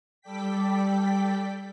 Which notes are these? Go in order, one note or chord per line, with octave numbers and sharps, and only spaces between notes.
G3 A4 D5 G5 B6